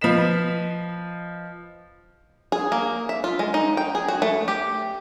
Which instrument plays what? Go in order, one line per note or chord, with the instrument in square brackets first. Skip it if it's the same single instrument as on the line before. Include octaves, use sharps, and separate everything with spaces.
[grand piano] F3 B4 D#5 B6 E7
[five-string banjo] G#4
A#3
E5
F4
G#3
D#4
G5
G#4
F#4
A3
G4